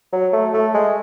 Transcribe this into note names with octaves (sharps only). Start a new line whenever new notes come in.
F#3
A3
A3
G#3